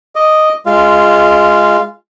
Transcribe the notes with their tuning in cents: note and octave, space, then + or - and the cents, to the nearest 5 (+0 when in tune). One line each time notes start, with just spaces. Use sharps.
D#5 +0 D6 +0
G#3 +0 F4 +0 F5 -20